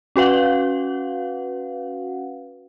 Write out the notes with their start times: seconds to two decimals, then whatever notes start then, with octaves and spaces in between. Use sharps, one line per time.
0.16 C#4 F#4 B4 F5 F#5